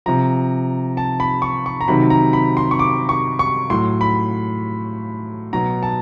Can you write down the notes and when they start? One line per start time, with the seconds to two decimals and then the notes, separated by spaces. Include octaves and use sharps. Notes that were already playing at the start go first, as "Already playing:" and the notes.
0.06 C3 F3 A#5
0.97 A5
1.20 B5
1.42 C#6
1.66 C#6
1.81 A#5
1.88 C3 D#3 F#3 B5
2.10 A#5
2.33 B5
2.57 C6
2.71 C#6
2.79 D6
3.09 C#6
3.39 C#6
3.70 A2 F#3 C6
4.01 B5
5.53 B2 F#3 A#5
5.83 A5